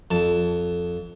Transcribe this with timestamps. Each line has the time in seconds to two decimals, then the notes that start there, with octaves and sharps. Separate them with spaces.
0.11 F2 A5